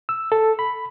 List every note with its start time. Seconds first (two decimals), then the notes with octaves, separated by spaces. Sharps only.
0.09 E6
0.32 A4
0.59 B5